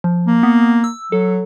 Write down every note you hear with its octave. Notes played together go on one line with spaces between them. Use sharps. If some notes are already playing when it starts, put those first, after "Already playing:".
F3
A#3
B3
E6
F#3 A4